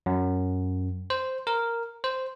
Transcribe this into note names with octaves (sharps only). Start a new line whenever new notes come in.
F#2
C5
A#4
C5